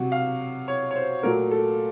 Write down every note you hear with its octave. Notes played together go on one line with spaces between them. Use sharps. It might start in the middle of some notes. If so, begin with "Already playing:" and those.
Already playing: C3 F#3 F#4
F5
C#5
C#5
C5
A#2 F#3 A3 A#4
A4